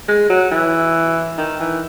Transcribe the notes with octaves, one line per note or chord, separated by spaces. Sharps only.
G#3
F#3
E3
D#3
E3